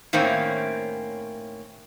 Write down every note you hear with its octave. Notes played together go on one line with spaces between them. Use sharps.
A2 D#3 A#3 C4 C#4 E4